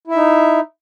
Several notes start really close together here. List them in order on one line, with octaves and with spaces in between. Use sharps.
E4 E5 D#4